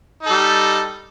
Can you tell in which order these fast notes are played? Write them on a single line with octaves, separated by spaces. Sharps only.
D#4 A4 G3